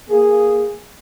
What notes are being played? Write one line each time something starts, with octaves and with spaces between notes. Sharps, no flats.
A#3 G#4